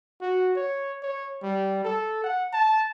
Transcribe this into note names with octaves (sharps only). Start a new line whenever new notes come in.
F#4
C#5
C#5
G3
A4
F#5
A5